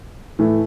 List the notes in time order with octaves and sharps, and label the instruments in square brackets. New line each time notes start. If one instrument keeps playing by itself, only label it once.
[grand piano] A2 E3 A3